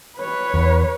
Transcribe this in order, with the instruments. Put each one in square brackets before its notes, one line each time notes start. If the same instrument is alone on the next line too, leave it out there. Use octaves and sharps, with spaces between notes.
[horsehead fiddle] B4 C#5
[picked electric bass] E2